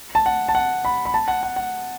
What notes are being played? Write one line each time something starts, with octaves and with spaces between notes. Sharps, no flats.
A5
F#5
A5
F#5
B5
B5
A5
F#5
F#5
F#5